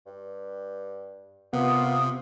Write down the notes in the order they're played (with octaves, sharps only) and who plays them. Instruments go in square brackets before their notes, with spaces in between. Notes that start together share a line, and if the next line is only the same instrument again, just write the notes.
[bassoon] G2
[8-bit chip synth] C3 [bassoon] A#3 [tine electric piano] B3 [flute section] F4 D#6